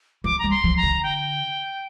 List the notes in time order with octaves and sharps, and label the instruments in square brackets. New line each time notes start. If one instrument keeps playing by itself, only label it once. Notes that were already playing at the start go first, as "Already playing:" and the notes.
[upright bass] F3 [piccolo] D6
[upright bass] G3 [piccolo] A#5
[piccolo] C6
[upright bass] F3
[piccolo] A#5
[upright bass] D3
[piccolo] G5